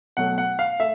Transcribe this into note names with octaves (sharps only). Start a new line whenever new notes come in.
B2 F#3 A3 F#5
F#5
F5
A3 E5